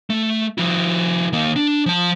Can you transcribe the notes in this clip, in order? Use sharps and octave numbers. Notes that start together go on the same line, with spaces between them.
A3
F3 E4
D#3 A#3
D4
F3 A5